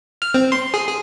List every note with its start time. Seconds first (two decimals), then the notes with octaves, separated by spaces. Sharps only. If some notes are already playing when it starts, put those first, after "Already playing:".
0.22 F6
0.34 C4
0.52 C6
0.74 G#4
0.87 G#4